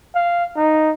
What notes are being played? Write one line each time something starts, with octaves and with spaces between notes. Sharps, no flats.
F5
D#4